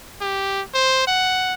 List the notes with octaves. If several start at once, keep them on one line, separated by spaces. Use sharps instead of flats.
G4
C5
F#5